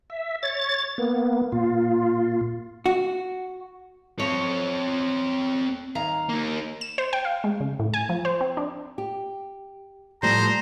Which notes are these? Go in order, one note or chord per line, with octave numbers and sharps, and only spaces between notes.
E5
C#5 A6
A#3 B3
A#2 F4
F#4
C4 A4 C#5
D#2 F5 A#5
A#3 D#4
E7
C5
G5
F5
G#3
C#3
A2
G#5
F3
C5
C4
D4
G4
A2 F3 G3 C5 A#5